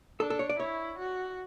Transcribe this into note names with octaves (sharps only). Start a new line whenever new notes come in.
D4 A4
A4
C#5
D5
E4 C#5
F#4